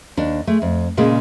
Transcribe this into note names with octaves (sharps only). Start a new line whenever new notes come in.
D#2 D4
G#3 A3
F2
A#2 C#3 G#3 A#3